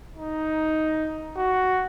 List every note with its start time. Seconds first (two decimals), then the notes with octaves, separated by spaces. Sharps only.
0.16 D#4
1.37 F#4